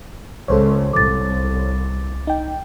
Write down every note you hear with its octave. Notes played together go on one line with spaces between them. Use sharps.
C#2 A4 C5 C#5
C2 D6 A6
D#4 G5